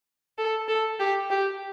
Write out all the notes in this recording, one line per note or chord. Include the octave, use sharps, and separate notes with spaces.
A4
A4
G4
G4